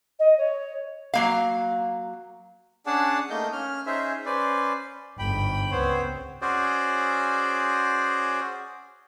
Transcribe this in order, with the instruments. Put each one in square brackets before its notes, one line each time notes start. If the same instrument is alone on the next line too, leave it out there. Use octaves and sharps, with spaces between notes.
[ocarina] D#5
C#5
[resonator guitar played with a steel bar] F#3 A#3 F5
[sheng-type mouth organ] C#4 D4 G#4 D5 F#5 A5
A3 A#3 D#4 D#5 G6
C#4 F6
C#4 D#4 G#4 C5 E5
C#4 B4 C5 D5
[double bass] G1 G#2 [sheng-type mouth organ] G5 B5
[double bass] C#2 C4 [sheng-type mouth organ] B3 C5 C#5
[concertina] C#4 F#4 G#4 C5 D5